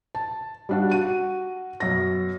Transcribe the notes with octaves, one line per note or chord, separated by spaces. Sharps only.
A5
G3 D4 F#4
F#4 D#7
F#2 B2 A#6